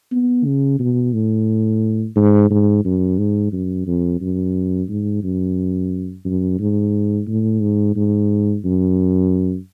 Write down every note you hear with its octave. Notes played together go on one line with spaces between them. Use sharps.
B3
C#3
B2
A2
G#2
G#2
F#2
G#2
F#2
F2
F#2
G#2
F#2
F#2
G#2
A2
G#2
G#2
F#2